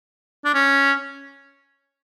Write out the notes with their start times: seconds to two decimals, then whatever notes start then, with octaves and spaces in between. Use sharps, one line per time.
0.45 D4
0.54 C#4